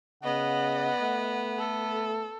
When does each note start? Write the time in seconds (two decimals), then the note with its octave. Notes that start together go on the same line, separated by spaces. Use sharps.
0.23 C#3 B3 D#5 F#5
1.01 A3
1.59 A4